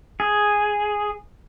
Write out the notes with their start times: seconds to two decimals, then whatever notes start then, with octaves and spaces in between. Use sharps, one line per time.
0.20 G#4